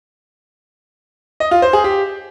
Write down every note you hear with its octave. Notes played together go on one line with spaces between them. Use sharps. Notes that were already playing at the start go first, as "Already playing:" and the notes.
D#5
F4
C5
G#4
G4